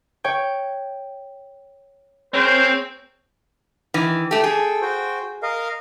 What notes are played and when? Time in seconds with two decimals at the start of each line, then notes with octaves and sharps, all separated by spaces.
0.24 C#5 G5
2.34 C4 G#4 A#4 C5 C#5
3.94 D#3 E3
4.31 A3 G4 A4 G5
4.44 G#4
4.82 F#4 C5 G5
5.43 A#4 D#5 F5